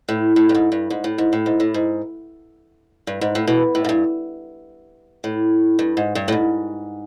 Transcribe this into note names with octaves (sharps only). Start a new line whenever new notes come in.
A2
A2
G2
G#2
G2
G#2
A2
G#2
A2
G#2
A2
G#2
G2
G#2
A2
B2
A2
G#2
G2
A2
G2
G#2
G2
A2
G#2